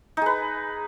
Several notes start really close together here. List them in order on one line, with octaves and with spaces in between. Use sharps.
D#4 G#4 B4